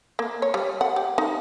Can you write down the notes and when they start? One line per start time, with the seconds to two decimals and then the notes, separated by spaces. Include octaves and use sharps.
0.19 A#3
0.42 C#5
0.54 G3
0.81 F#5
0.96 G4
1.18 D#4